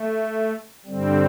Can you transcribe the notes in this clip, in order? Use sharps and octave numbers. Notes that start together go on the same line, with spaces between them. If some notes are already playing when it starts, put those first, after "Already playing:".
Already playing: A3
G2 D3 G3 C4